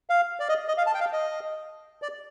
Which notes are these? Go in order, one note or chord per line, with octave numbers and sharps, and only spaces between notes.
F5
D5
D#5
D#5
F5
A5
G5
F5
D#5
D5